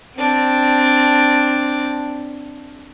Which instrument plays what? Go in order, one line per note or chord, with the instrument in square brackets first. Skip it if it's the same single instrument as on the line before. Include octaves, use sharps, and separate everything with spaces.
[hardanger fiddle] C4 D4